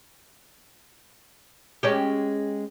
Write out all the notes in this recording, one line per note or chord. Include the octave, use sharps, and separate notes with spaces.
G#3 C#4 G4